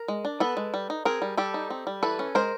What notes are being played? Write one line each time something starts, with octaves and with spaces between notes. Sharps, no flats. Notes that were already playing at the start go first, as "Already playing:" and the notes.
Already playing: A#4
G#3
D4
B3 A4 B4
G#3
G3
D#4
C4 G#4 A#4
G3
G3 G4 A4
D#4
C4
G3
E3 A4 B4
C#4
G#3 A#4 C5